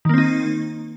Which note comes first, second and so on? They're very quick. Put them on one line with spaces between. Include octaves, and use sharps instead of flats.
D#3 A#3 C4 D#4